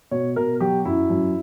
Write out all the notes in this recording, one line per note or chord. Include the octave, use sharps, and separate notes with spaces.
B2 C#5
B2 A#4
F#3 G4
F#2 E4
F#2